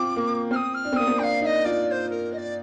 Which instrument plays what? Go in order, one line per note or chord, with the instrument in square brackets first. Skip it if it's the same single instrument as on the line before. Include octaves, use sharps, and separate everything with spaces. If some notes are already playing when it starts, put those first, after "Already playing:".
Already playing: [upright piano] C4 F4 [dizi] D6
[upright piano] A#3
[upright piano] C4 [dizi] F6
[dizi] D#6
F6
[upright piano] D4
C4
[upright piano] A#3 [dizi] D#6
[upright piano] C4
[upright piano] D4 [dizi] F5 G5
[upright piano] D#4 [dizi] D#5 F5
[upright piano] F4 [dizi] D5
[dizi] D5
C5
A#4
D#5
D5